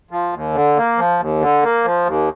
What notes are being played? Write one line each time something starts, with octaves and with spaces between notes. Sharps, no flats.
F3
D#2
D3
A#3
F3
D#2
D3
A#3
F3
D#2